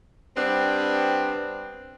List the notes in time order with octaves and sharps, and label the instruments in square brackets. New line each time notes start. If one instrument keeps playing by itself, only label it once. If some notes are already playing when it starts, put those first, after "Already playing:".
[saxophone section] G3 B3 C4 D4